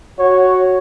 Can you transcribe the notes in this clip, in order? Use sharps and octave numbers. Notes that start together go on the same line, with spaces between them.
F#4 C#5